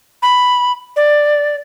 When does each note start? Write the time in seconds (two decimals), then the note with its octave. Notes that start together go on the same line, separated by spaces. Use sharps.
0.22 B5
0.96 D5